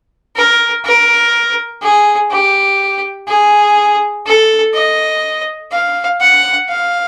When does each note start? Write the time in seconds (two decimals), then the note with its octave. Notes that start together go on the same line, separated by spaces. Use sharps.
0.36 A#4
0.85 A#4
1.82 G#4
2.31 G4
3.28 G#4
4.26 A4
4.74 D#5
5.71 F5
6.21 F#5
6.69 F5